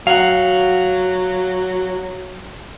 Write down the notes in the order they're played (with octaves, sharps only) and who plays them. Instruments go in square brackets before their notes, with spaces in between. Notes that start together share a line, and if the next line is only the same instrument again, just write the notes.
[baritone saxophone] F#3 [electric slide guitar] F5 F#5